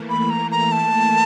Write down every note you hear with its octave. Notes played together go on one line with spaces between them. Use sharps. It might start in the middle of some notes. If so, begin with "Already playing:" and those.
Already playing: E3 A3 A#3
B5
A#5
A#5
A5